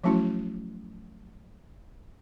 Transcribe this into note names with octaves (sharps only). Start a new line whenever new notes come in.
F3 F#3 A3 C#4 E4 F#4